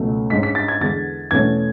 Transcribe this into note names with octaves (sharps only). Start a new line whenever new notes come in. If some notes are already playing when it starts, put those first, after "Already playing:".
Already playing: C#2 B2 F#3 A3 C#4
G#2 G#3 C#4 B6
B6
A6
G#6
E2 D3 G#3 B3 A6
E2 B2 A3 C#4 G#6